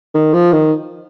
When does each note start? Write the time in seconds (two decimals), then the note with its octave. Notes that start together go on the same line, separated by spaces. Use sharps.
0.14 D#3
0.33 F3
0.52 D#3